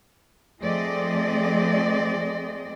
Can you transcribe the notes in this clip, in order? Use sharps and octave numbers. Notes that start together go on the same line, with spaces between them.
F3 A3 C4 G#4 D5 D#5